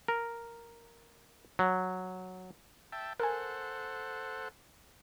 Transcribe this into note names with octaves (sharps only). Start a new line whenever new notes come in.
A#4
F#3
E5 G5 A5
A4 A#4 C5 F#5 G#5